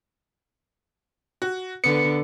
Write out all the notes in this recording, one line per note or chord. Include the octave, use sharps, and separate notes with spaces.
F#4
D3 B3 C#7